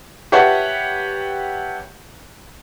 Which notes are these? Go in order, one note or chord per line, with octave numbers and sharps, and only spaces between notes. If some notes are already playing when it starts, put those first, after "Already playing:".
G4 B4 C#5 E5 F#5 A5